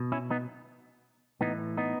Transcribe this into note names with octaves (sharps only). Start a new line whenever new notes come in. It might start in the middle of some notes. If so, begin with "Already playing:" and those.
Already playing: B2
C#4 E4
B3 D#4
A2 E3 B3 D#4
B3 D#4